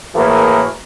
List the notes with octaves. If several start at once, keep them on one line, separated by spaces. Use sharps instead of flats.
A2 E3 A#3 F#4 G#4 A#4